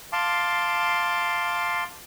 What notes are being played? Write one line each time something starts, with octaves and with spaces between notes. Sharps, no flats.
F5 A5 C6 D6